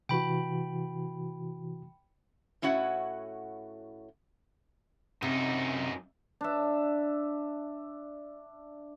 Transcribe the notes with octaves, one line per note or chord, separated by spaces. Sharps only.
C3 E3 F#4 G5 B5
A2 C#4 E4 F#4 F#5
F#2 C3 D#4
D4 E5